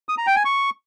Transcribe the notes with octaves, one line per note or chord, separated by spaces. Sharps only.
D#6
A#5
G5
G#5
C#6